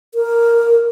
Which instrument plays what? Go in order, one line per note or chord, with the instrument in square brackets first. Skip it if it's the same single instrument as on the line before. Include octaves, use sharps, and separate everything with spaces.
[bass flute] A#4